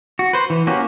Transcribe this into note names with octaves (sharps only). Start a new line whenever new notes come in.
F#4
B4 C5
E3
A#3 C#4 F#4 G4